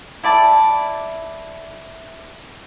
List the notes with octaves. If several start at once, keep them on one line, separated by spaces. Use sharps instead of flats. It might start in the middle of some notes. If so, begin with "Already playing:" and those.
E4 D5 A5